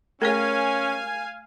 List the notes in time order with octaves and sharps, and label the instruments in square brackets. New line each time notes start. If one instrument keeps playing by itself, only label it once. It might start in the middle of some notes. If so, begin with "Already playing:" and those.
[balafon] A3 G#4 C#5 [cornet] C#4 [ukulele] A#4 [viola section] F5 G#5